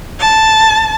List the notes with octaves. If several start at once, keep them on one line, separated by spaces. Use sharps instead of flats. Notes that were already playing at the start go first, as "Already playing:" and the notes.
A5